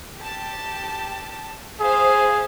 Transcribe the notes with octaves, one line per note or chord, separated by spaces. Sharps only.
G4 A5
G#4 C5 E5 F5